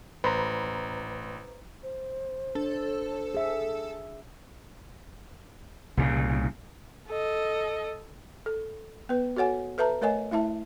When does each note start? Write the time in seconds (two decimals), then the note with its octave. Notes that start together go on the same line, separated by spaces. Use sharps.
0.24 A1 B4 C5 A#5
1.83 C5
2.55 D4 A4
3.34 G#4 E5
5.97 C2 A#2 C#3
7.08 A4 D#5
8.46 A4
9.09 B3 B4
9.36 F#4 A4 C#5 F#5 G#5
9.78 A4 B4 E5 A5 A#5
10.01 A3 A#4 C#5 D#5 G#5
10.31 A3 E4 E5 A5